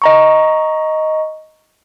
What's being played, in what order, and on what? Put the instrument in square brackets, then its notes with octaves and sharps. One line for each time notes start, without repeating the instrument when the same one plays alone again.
[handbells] D#5 A#5 C#6